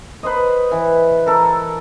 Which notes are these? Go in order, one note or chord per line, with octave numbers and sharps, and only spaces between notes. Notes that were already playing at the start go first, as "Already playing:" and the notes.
B4 C5 D#5
E3
A4 A#4